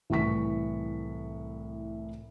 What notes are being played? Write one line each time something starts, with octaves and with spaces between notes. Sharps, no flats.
C2 A2 E3 C#6 B6